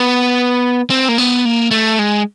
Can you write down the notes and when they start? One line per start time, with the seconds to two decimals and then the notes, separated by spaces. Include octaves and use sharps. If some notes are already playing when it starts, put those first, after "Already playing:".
Already playing: B3
0.90 C4
1.09 A#3
1.18 B3
1.45 A#3
1.71 A3
1.99 G#3